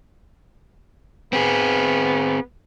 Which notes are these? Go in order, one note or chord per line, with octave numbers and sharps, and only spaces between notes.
B3 C4 G#4